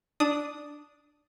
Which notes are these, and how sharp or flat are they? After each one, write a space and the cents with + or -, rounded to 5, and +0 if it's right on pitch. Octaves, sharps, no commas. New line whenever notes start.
D4 +0 D#6 +0